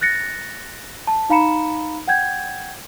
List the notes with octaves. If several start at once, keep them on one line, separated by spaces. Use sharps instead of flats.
F#6 A6 A#6 C#7
A5
D#4 F5 A#5 B5 C#7 E7
F#5 G5 G6 G#6